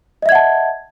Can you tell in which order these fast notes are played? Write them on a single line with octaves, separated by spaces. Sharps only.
D#5 E5 G#6 F#5 A5